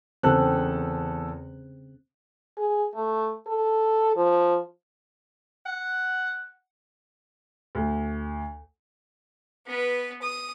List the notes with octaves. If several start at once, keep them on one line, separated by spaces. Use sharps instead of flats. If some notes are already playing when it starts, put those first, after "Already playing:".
E2 C#3 C4 A4 F#6
G#4
A3
A4
F3
F#5
D2
B3 B4
D#6